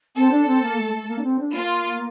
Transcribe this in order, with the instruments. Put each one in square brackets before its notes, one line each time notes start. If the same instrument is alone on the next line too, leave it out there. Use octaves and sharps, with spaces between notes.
[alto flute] C4 [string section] A4
[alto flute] D4
C4
A#3
A3
A3
A#3
D4
C4
D4
[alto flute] A#3 [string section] F4